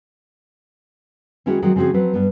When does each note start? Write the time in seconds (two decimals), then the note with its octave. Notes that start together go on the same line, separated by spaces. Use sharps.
1.46 D#3 G#3 C#4 E4 F#4 G#4
1.62 D#3 F3 F#3 G#3 C4
1.76 C#3 F3 C4 F#4 G#4
1.94 F3 F#3 C4 B4
2.14 G2 B3